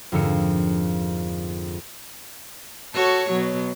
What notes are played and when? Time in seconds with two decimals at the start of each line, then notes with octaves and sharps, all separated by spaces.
0.12 F2 G#2 D3 A4 A#4 C#7
2.94 F#4 A4 C#5
3.30 B2 F#3